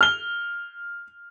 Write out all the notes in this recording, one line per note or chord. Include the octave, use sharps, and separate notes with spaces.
F6 G7